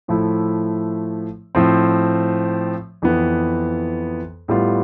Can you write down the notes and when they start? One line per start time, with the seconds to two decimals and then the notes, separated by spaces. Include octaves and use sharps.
0.08 A2 F3 A3 E4
1.55 A2 F3 C4
3.02 F2 E3 B3
4.48 A2 G3 B3 F4